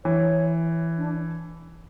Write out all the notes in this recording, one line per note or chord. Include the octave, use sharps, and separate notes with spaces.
E3 C#5
D4